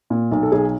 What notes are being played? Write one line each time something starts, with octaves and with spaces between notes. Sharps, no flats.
A#2
B1
A4
B1 G#4